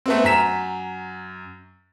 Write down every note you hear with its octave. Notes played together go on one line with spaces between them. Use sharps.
A3 B3 C4
F#2 A#5 B6 E7